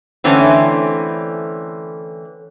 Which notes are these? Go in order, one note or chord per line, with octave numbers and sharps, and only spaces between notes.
D3 E3 A3 C4 C#4